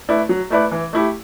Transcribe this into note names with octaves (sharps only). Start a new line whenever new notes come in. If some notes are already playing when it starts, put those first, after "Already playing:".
A3 E4 B4 D5
F#3
A3 E4 B4 D5
E3
A3 E4 G4